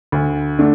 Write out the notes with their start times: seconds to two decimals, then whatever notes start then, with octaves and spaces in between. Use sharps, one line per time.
0.12 D2
0.59 D3 A3 D4